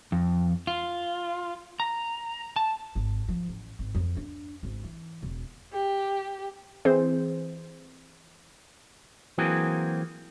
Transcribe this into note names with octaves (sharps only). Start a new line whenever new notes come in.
F2
F4
A#5
A5
G#1
F3
A1
G#1
F2
D4
G#1
E3
E1
G4
E3 C4 G#4 C5
E3 F#3 A#3 C4 F#4 G#4